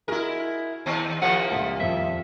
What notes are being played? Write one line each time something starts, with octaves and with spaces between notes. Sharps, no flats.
E4 F#4 G#4 A#4
D#2 C4 A5 C#6 C7
C3 F3 A#3 F#5
C#2 A#2 A3
D#1 F2 A#2 E5